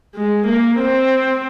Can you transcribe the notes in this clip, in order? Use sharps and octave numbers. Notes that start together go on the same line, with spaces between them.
G#3
A#3
C4